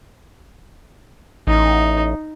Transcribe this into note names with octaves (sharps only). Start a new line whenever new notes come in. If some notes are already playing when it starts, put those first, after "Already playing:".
A1 D#4